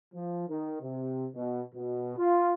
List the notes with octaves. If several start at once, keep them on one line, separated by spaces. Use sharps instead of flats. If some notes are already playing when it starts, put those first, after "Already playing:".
F3
D#3
C3
B2
B2
F4